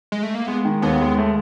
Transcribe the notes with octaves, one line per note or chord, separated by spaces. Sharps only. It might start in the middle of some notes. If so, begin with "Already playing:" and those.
G#3
A3
A#3
G#3 B3
D#3
D#2 B3
G#3
A3